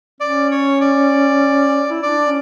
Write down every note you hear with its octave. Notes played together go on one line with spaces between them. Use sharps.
C#4 D5
C#5
D5
E4
D4 D5
C#4